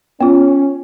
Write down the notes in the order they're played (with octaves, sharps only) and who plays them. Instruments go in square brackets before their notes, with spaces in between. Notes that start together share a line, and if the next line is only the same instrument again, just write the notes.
[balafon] B3 F4 [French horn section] C#4